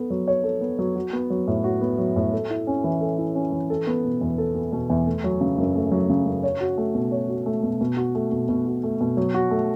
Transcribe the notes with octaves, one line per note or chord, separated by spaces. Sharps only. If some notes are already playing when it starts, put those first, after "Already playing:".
Already playing: B3 A4
F#3
C#5
A4
B3
F#3
F#4
B3
F#3
A2
F#4
B3
F#3
A2
A4
E4
C#4
E3
A4
E4
C#4
E3
A4
B3
B2
E2
A4
B3
B2
E2
A3
F#3
C#3
F#2
A3
F#3
C#3
F#2
C#5
F#4
A3
B2
C#5
F#4
A3
B2
B2
F#4
A3
B2
B2
F#4
A3
B2
F#3
F#4
A3